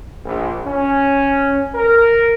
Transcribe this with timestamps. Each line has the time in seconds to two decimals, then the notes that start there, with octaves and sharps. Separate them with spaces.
0.25 A#1
0.66 C#4
1.75 A#4